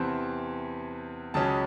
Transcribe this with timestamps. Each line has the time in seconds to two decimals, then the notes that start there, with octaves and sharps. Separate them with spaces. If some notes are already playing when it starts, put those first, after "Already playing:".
Already playing: E2 C3 E3 C4 A5
1.34 C#2 C#3 F#3 C#4 A5